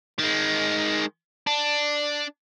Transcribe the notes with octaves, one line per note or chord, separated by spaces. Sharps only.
D#3 G#3
D4